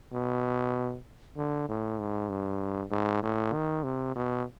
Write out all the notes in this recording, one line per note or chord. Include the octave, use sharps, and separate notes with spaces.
B2
D3
A2
G#2
G2
G#2
A2
D#3
C3
B2